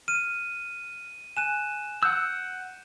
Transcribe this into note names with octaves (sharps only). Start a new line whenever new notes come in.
F6 D#7
G#5 F#6 D#7 E7
F#5 E6 F#6 G6